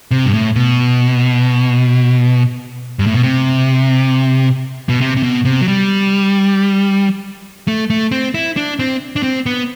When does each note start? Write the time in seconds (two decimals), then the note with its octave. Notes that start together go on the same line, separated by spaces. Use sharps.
0.11 C3
0.26 G2
0.34 A2
0.56 B2
2.99 G2
3.07 A2
3.14 B2
3.23 C3
4.89 B2
5.01 C3
5.17 C3
5.23 B2
5.45 C3
5.61 F#3
5.68 G3
7.68 A3
7.90 A3
8.12 C4
8.34 E4
8.57 D4
8.79 C4
9.16 D4
9.23 C4
9.46 B3